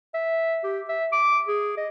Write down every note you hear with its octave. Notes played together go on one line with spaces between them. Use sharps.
E5
G4
E5
D6
G#4
D#5